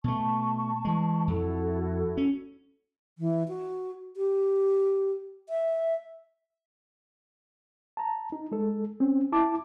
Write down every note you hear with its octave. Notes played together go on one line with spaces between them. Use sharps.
B2 A3 A5 C#6
E3 G#3
F2 E4 F#4 A4
C#4
E3
F#4
G4
E5
A5 A#5
D#4
G#3 A4
C4 C#4
E4 A5 D6